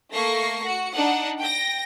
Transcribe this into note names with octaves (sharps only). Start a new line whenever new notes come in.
A3 A#3 C#6 A#6 C7
F#4 C#7
D4 D#4 F#5
G5 A#6